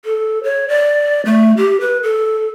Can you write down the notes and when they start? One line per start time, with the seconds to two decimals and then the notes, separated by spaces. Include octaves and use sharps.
0.05 A4
0.44 C#5
0.68 D5
1.26 A3
1.57 G4
1.80 B4
2.03 A4